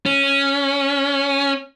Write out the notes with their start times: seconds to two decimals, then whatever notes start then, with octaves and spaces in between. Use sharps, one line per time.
0.06 C#4